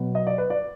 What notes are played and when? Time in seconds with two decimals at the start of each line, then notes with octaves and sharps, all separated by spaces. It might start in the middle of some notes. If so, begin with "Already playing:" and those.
Already playing: B2 F#3 B3
0.15 D#5
0.27 D5
0.38 B4
0.50 D5